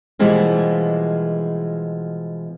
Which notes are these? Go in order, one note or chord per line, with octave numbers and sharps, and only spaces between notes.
B2 E3 F3 G3 G#3 A#3